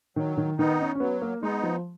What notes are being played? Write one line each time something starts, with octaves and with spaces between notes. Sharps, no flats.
D#3 F#3
D#3
D#3 B3 D#4
C#4
C#4
F#3 B3
A#3
G#3 B3 D#4
F3